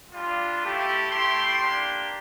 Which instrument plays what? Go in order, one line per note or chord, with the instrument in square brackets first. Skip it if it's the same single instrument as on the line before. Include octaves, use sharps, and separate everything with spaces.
[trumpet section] G3 D4 F4
A3 E4 G4
A3 E4 G4 C6
A#3 D4 G4